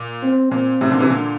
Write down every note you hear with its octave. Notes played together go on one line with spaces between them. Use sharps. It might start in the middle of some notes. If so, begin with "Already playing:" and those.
Already playing: A#2
C4
A#2 C4
A2 C3
A#2 D3
C3 E3
A#2 D3